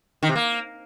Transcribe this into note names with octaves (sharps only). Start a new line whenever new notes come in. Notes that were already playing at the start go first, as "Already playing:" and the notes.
D#3
C3
A#3